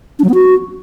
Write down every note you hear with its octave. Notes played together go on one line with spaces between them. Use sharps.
D4
F#3
B3
F#4